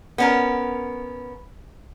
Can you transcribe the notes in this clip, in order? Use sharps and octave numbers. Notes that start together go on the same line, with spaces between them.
B3 C#4 A#4